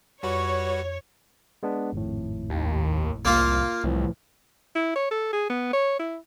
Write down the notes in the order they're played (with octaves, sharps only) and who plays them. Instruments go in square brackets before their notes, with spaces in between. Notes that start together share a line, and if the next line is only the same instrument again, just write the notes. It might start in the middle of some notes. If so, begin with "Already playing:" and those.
[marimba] F2 [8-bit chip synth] G3 F#4 B4 [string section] C#5 [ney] C#6
[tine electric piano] G#3 B3 D4
G#1 F2 A2
[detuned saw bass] D#2
[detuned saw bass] C2 [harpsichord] A#3 F4
[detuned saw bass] C2 [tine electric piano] A2 E3 F3
[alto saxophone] E4
C#5
A4
G#4
B3
C#5
E4